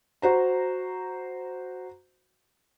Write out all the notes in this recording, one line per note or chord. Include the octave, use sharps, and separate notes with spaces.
F#4 C5 A#5